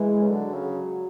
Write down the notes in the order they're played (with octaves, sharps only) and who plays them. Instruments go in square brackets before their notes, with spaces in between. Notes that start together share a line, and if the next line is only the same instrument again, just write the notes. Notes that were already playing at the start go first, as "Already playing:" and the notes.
Already playing: [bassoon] E3 [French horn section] G#3
[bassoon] C#3
[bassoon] D3 [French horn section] F#3
[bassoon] C#3